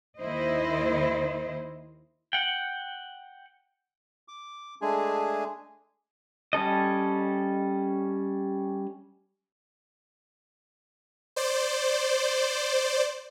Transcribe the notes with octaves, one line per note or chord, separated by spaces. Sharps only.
D#2 D#3 E4 C5 D#5
F#5 G5
D6
G#3 A3 D4 G#4 G#5
G3 C#4 A4 D#5
C5 D5